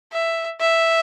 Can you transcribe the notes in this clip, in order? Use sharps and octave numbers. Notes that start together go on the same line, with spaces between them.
E5
E5